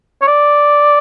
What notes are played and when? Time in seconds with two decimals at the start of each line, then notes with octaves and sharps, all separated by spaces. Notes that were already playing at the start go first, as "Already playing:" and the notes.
0.21 C#5
0.27 D5